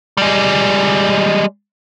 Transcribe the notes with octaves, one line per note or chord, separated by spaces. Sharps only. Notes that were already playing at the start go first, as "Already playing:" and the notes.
G3 G#3